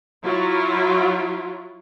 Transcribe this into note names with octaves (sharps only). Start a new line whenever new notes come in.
F#3 E4 F4